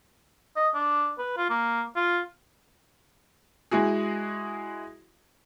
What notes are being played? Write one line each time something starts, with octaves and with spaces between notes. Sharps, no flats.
D#5
D4
B4
F4
A#3
F4
G#3 E4 F#4 G#4